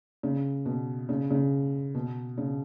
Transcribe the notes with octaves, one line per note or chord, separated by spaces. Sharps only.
C#3
B2
C#3
C#3
B2
C#3